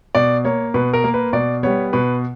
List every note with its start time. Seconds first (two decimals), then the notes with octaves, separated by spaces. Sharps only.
0.15 B2 D5
0.45 A#3 C#5
0.74 B2 B4
0.93 A#4
1.04 A#3
1.14 B4
1.33 B2 D5
1.63 G3 B3 C#5
1.93 B2 B4